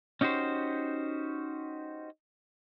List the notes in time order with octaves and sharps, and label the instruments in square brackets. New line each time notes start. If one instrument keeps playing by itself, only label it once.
[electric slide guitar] C#4 D#4 F#4 G4 C5